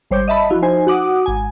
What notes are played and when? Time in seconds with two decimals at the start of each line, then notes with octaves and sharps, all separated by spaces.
0.11 G#1 G3 C5 C#5 D6 G6
0.28 D#5 E5 A5 B5
0.50 F3 E4 F#4
0.62 D#4 C5 G#5
0.87 F#4 F#5 D6 D#6
1.26 G#1 G#5